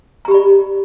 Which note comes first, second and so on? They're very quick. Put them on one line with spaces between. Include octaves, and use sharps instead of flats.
A#5 G4 B5 D5